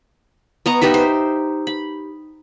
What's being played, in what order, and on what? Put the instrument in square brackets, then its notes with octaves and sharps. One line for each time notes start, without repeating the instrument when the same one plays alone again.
[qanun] B3 D#5 A#5 C#6
D#4 G4 B4 E5
C5
B5